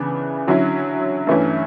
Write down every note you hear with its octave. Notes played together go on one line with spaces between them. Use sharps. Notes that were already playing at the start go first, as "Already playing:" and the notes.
Already playing: C#3 E3 B3 D4
D3 F#3 C#4 E4
G2 E3 A3 C#4 E4